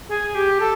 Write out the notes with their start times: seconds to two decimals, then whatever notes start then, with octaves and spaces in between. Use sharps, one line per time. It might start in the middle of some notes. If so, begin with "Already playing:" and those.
0.09 G#4
0.35 G4
0.60 A4